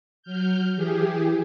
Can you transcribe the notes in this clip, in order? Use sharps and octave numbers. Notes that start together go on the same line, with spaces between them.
F#3 F6 G6
E3 G4 G#4